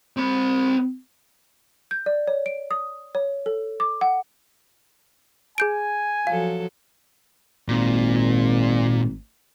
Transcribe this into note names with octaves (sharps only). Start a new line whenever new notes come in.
C4 B5
G6
D5
C#5
D7
D#6
C#5
A4
D6
F#5
G#4 G#5 G6 D7
F3 F#3 A4 F5
G#1 A#2